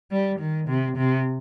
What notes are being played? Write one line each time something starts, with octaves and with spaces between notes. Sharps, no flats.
G3
D#3
C3
C3